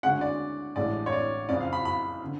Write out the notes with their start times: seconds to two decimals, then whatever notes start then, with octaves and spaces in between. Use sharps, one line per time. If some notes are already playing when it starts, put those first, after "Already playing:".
0.03 D2 D3 G#3 C#4 F#5
0.21 D5
0.76 A1 A2 G#3 D4 D5
1.06 C#5
1.12 D5
1.49 F#1 F2 C#3 D5
1.60 F5
1.73 B5
1.85 B5
2.24 D3